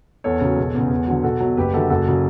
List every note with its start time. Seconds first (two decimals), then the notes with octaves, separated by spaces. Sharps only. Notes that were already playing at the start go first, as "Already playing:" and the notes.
0.24 E2 A4 C#5
0.41 C#3 F#3
0.57 E1
0.74 E2 C#3
0.91 E2
1.07 D3 F#3
1.23 B1 F#4 A4
1.40 B2 F#3
1.57 F#1 G4 B4
1.74 F#2 D3 F#4 A4
1.90 F#1 F#4 A4
2.08 C#3 F#3